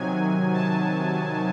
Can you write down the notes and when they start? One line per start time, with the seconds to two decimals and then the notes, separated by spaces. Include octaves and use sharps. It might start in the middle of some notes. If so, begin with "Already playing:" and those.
Already playing: C3 D#3 F#3 G#5
0.53 A5